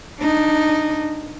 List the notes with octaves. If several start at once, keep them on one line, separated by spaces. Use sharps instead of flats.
D4 D#4